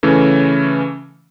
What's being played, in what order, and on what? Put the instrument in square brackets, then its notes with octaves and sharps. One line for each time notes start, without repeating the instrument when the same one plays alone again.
[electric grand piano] C#3 E3 A3 C#4